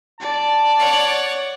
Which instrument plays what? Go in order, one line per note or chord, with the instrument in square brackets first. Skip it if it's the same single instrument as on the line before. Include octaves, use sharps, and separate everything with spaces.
[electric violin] D5 [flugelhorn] A5
[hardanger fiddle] C#5 F#5